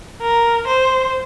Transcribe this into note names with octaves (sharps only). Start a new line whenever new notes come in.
A#4
C5